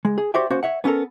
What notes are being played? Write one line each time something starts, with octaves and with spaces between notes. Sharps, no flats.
C#2 G#3
G#4
F#4 G4 C5 D5 E5 G5
A#3 C#4 F#4 C5
C#5 E5 F#5
B3 C#4 F4 A4 A#4